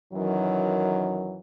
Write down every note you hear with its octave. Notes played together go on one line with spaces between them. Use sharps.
F#2 D#3 E3 F#3